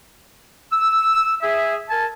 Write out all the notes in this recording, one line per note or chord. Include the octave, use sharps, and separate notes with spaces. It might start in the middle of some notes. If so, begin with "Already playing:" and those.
E6
G#4 E5
A#4 G#5 A5